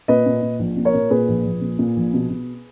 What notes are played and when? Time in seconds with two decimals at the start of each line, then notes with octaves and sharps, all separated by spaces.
0.08 A#2 B4 D#5
0.26 A#2
0.42 A#2
0.59 A#1
0.77 A#2
0.85 A#4 C#5
0.94 A#2
1.10 A#2 G#4 B4
1.28 A#1
1.45 A#1
1.61 A#2
1.79 A#2
1.96 A#1
2.13 B2
2.30 B2